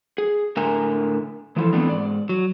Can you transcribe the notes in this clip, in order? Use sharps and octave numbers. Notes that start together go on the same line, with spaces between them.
G#4
A2 D3 A#4 E5 G#5 A#5
E3 F3 E4 F4 A4
E3 A3 B3 C4 D4 D#4
G#2 D5
F#3